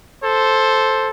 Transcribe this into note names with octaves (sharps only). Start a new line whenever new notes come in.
A4 C5